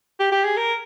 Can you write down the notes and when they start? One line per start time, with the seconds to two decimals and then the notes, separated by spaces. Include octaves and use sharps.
0.20 G4
0.32 G4
0.44 G#4
0.57 A#4